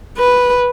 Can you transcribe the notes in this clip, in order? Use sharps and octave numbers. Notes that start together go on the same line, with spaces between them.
B4